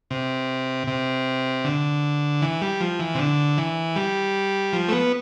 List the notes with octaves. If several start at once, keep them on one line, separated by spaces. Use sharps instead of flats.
C3
C3
D3
E3
G3
F3
E3
C3
D3
E3
G3
F3
A3
B3